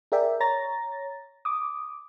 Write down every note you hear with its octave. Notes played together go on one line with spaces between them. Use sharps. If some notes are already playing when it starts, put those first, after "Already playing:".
G#4 A#4 D5 E5 G5
C#5 A#5 A6 A#6
D6 D#6